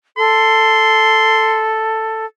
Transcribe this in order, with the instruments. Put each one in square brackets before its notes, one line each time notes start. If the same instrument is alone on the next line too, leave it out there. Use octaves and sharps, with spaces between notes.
[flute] A4 [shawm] C6